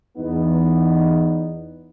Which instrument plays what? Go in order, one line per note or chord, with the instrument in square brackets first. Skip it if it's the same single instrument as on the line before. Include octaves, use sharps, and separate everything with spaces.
[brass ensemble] E2 B3 D#4